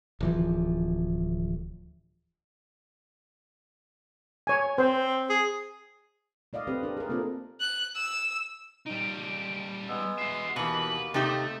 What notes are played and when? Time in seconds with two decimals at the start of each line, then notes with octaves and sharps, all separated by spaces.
0.20 D1 E3 F3
4.47 C#5 G#5
4.78 C4 C5
5.30 G#4
6.53 A3 D5 D#5 F5
6.67 C4 G4 B4
6.83 D4 A#4
6.97 G#4 A#4
7.09 A#3 C4 F4 A4
7.60 F#6
7.95 E6
8.86 G3 D#4 D7
9.89 G#3 B3 E6
10.18 F#4 E5 C7
10.56 D#2 B2 E3 A#3 B4 F#7
11.14 C3 A3 D#4 G4 A6